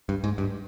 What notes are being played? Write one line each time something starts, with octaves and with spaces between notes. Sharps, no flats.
G2
G#2
G2